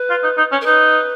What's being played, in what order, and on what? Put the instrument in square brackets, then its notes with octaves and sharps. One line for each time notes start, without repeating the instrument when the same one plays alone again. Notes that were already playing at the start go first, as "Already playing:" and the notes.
Already playing: [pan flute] B4
[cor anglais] F4
D#4
D#4
C#4
[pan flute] A#4
[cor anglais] D#4 [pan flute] B4